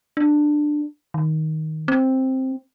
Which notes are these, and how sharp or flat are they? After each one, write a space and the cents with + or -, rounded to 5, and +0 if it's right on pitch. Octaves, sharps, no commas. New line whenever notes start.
D4 +15
D#3 +10
C4 +5